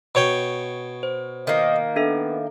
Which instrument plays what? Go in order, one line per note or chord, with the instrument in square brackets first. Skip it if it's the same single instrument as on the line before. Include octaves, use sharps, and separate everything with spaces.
[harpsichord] B2 C#5 G5
[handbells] C5
[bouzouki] D#3 A#3 [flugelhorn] D#5
[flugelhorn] B3 [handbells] D4 A4 E5